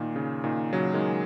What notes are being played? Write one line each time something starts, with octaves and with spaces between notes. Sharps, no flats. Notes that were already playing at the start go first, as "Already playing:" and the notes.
Already playing: A#2 D#3
C#3
A#2 D#3
C#3 F#3
D#3 G#3